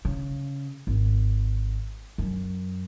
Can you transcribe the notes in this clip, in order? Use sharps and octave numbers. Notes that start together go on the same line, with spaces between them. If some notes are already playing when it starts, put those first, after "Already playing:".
C#3
G#1
F#2